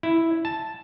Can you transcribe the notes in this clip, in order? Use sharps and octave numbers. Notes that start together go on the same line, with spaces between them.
E4
A5